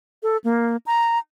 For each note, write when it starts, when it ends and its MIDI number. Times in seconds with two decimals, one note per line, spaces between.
0.23 0.37 69
0.44 0.77 58
0.86 1.19 82